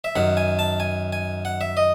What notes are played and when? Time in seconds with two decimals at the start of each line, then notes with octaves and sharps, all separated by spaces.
0.04 E5
0.16 F#2 D#3 F#5
0.37 G#5
0.59 A5
0.80 G#5
1.13 G#5
1.45 F#5
1.61 E5
1.77 D#5